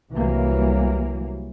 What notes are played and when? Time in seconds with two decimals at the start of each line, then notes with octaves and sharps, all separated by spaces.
0.11 C2 E3 F#3 A#3